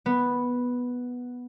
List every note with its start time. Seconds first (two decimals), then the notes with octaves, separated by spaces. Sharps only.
0.06 B3